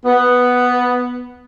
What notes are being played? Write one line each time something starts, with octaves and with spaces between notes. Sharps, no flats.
B3